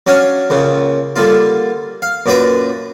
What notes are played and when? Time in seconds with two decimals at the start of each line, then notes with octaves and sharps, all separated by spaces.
0.07 F#3 C#4 D4 C#5 F5
0.50 C#2 A#2 C#3
1.16 D3 G3 A#3 F4
2.02 F5
2.26 F#2 A#2 D4 F#4 B4 D6